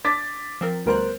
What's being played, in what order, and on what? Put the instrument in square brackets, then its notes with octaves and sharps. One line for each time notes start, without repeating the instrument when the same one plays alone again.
[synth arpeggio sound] D4 [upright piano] D6 A6 B6
[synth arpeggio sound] F3 C4 A#4
[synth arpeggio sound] D2 G3 F#6 [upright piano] B3 A#4 C5